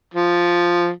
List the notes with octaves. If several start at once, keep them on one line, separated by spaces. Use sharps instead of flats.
F3